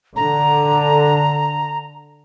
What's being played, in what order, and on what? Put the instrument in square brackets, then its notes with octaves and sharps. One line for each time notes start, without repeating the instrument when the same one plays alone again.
[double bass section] D3 [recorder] A#5